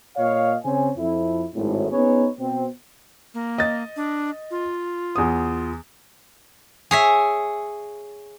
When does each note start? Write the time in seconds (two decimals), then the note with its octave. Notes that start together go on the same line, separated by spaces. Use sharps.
0.17 A#2 C#5 D#5 F5
0.64 C#3 C4 C#5 G#5
0.97 F2 F3 E4
1.55 G#1 A2
1.92 B3 C#4 D#4 G#4 B4 C#5
2.39 B2 C4
3.34 A#3
3.58 D#5 A6
3.96 D4
4.51 F4
5.15 E2 D#6
6.91 G#4 C#5 E5